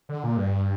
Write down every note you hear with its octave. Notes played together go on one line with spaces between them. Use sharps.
D3
A#2
G2